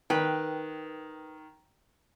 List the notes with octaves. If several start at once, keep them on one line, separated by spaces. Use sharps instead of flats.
D#3 B4 G5